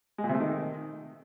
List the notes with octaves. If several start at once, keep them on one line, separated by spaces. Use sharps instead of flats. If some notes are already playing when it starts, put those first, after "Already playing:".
G#3
A#2
C3
A3
D#3